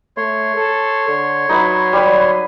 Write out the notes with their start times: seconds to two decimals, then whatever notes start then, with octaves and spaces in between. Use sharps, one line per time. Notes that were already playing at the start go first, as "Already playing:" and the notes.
0.17 A3 C#5 C6
0.56 A4
1.08 D3
1.49 F#3 D#4 B4 E5
1.93 G3 B4